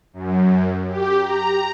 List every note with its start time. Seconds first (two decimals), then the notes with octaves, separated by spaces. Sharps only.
0.13 F#2
0.88 G4
1.21 A#5